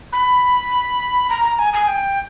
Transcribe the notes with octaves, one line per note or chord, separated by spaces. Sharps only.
B5
A#5
A#5
G#5
G#5
G5